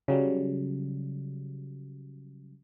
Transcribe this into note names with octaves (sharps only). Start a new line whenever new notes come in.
C#3 F#3 G3